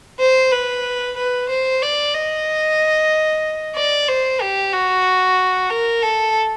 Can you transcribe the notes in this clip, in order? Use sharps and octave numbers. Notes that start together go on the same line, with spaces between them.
C5
B4
B4
C5
D5
D#5
D5
C5
G4
F#4
A#4
A4